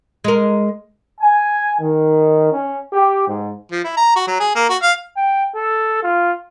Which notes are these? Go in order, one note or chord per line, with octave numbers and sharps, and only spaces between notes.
G#3 A#4
G#5
D#3
C#4
G4
G#2
F3
E4
A#5
F#4
F#3
G#4
A#3
F#4
F5
G5
A4
F4